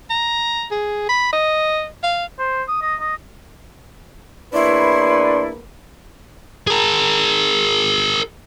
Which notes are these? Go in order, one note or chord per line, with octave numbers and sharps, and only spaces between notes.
A#5
G#4
B5
D#5
F5
C5
D#6
D#5
D#5
E2 A#3 D4 E4 B4 C#5 C6 C#6
G#4 A#4